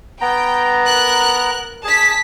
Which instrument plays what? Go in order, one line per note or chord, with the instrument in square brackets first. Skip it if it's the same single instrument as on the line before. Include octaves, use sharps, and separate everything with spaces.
[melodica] B3 A#5 [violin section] G5
[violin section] A#4 F#6
[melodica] G#4 [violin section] A5 B6